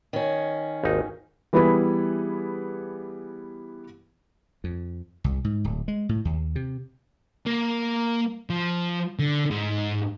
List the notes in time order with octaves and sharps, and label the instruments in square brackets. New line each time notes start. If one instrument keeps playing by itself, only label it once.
[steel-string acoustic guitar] D#3 C#4
[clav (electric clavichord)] G#1 D#2 D#4
[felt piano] E3 G3 B3 E4 G#4 B4
[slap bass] F2
C2
G#2
D1
G#3
A2
D#2
C3
[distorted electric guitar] A#3
F3
D3
G#2